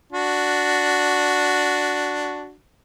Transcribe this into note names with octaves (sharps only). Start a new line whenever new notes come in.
D4 F#4